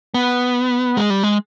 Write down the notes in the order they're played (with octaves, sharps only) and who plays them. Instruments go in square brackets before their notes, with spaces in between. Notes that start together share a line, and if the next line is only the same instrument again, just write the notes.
[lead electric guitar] B3
G#3
G3
G#3